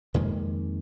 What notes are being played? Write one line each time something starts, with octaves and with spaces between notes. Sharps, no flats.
F2 D#3 G#3 A#3